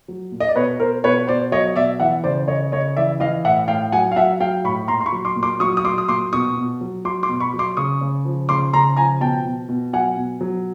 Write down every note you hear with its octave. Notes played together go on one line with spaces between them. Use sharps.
F#3
A#2
D#5
D5
B2 B4 C#5
B2 A#4 C5
B2 B4 C#5
B2 C5 D5
F#3 C#5 D#5
B2 D5 E5
E3 E5 F#5
C#3 C5 D5
C#3 C#5 D#5
C#3 C#5 D#5
E3 D5 E5
E3 D#5 F5
A2 E5 F#5
A2 F5 G5
F#3 F#5 G#5
F5
F#3 E5 F#5
F#3 F5 G5
A2 B5 C#6
A#2 A#5 C6
C6
B5 C#6
F#3
C6 D6
A#2
C6 D6
F#3 C#6 D#6
D#6
F#3 C6 D6
D#6
A#2 C6 D6
B2 C#6 D#6
B2
F#3
F#3 C6 D6
C6 D6
B2
B5 C#6
F#3
C6 D6
C#3 C#6 D#6
C#3
F3
C#3 C6 D6
C#3 A#5 C6
F3 G#5 A#5
B2 G5 A5
B2
B2
F#3 F#5 G#5
B2
F#3